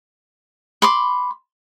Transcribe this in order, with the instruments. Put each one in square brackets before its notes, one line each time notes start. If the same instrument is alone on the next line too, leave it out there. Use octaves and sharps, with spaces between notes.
[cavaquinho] B5 C6 D6